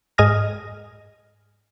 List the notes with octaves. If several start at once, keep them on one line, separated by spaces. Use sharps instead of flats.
G#2 D#5 G#5 D#6 F6 A#6